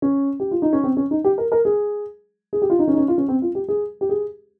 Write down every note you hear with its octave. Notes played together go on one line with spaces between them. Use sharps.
C#4
G4
F4
D#4
C#4
C4
C#4
D#4
G4
A#4
A#4
G#4
G#4
G4
F4
D#4
C#4
D#4
C#4
F4
C#4
C4
F4
G4
G#4
G4
G#4